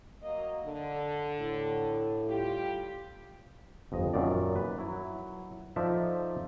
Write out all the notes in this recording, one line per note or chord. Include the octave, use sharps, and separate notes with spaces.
F#3 A#3 D#5
D3
A2
G3 F4 G4
G1 F2 D#5
F#2 A#2 D#3 D5
B4
F#3 E4
F3 D#4 A4 D5 E5